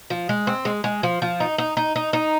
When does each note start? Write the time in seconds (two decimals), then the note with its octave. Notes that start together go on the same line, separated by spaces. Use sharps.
0.10 F3
0.29 G#3
0.47 C4
0.65 G#3
0.84 G#3
1.03 F3
1.22 F3
1.40 D#4
1.58 D#4
1.77 D#4
1.96 D#4
2.13 D#4